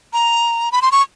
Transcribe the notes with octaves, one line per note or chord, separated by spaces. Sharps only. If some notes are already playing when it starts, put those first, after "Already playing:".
A#5
B5
C6
C#6